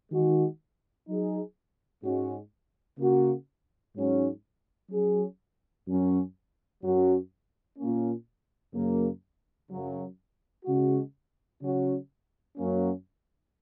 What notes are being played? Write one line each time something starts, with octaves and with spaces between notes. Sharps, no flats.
D#3 G#3 F#4
F#3 D#4 G#4
G#2 G#3 C#4 F#4
C#3 A#3 F#4
G#2 F#3 C#4
F#3 C#4 G#4
F#2 F#3 C#4
F#2 F#3 C#4 F#4
A#2 A#3 C#4
F#2 C#3 A#3
F#2 C#3 F#3
C#3 G#3 F#4
C#3 F#3 C#4 F#4
F#2 F#3 A#3 C#4